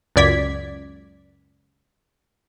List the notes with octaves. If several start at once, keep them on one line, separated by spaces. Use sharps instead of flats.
C#2 F#2 D5 G#6 B6